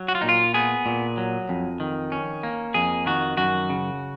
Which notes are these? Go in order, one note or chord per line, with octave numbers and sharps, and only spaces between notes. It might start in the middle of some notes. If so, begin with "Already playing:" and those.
Already playing: F#3
F#4
F4
A#2 D#4
F4
B3 G#4
A#2
F#3
F2
D#3
C#4
A#3
F2 G#4
D#3 F#4
F#2 F#4
C#3